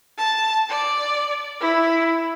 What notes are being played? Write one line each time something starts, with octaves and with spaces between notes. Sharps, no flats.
A5
D5
E4